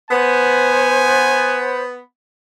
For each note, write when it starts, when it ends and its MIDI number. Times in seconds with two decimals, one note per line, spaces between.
0.11 1.99 59
0.11 1.82 72
0.11 1.67 80